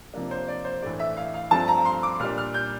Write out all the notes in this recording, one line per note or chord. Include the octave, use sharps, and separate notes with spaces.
C3 F3 A#3 D4
C5
D5
C5
A2 E3 A3 D4 D5
E5
F5
F5
G2 F3 A3 C4 A5
A#5
C6
D6
A#2 G3 D4 F6
F6
G6